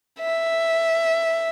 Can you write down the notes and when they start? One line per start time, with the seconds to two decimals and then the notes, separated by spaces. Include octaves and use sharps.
0.20 E5